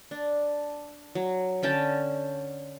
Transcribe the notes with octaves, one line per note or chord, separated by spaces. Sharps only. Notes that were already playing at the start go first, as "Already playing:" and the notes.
D4
F#3
D3 C#4 G5 A5